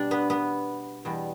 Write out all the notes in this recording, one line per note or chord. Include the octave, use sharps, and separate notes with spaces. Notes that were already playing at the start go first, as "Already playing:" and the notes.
Already playing: B2 G3 D4 D5
B3 B4
B3 B4
E2 B2 G3